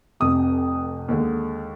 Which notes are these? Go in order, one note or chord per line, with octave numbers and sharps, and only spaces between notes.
F1 F2 C3 D#6
D#2 D3 G#3